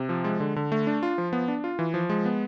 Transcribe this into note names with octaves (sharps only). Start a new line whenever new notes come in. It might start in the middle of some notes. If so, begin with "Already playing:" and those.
Already playing: C3
F3
G#3
D3
D3
A3
D4
F4
F3
B3
D4
F4
E3
F3
G#3
B3